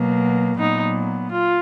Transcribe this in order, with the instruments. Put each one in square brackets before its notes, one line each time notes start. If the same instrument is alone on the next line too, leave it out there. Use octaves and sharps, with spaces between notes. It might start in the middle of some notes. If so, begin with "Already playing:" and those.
Already playing: [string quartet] B2 F#3 A#3
A#2 F#3 B3 D#4
F4